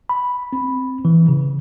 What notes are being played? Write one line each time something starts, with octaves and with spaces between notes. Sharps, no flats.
B5
C4
E3
C#3